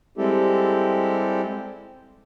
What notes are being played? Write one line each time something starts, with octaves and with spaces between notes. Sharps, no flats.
G3 G#3 C4 E4 G4 A4